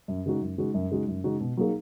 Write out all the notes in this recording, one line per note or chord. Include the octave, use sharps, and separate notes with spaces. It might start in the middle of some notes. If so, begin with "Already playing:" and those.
F#2
C#3 G#3 D#4 F#4
F#2
C#3 G#3 D#4 F#4
F#2
C#3 G#3 D#4 F#4
F#2
C#3 G#3 D#4 F#4
B2
F#3 A#3 D#4 G#4